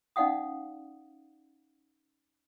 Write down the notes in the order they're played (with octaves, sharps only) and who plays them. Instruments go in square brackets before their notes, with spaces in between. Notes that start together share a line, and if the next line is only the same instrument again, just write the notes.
[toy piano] C#4 D#4 D5 F5 F#5 D#6